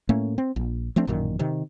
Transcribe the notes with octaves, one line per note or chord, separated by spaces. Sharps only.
A2 A3 A#3 C#4
C4
A#1
F3 A3 C4 D4
A1 F#2 A#2 D#3
C3 D#3